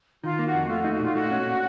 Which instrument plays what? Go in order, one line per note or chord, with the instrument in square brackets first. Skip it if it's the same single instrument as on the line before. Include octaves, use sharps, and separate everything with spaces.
[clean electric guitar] D#3 [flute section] F4
[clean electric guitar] A#3
[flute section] F#4
[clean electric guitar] F2
[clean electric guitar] A3 [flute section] F4
[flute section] F#4
[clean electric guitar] D#4
[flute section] F#4
[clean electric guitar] A#2 [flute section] F4
[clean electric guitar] A3 [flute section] F#4
[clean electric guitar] C#4
A#2